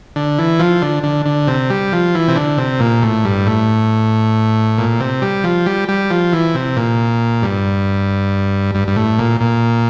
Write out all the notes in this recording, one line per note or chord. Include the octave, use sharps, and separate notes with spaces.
D3
E3
F3
D3
D3
D3
C3
G3
F3
E3
C3
D3
C3
A#2
A2
G2
A2
A#2
C3
G3
F3
G3
G3
F3
E3
C3
A#2
G2
G2
G2
A2
A#2
A#2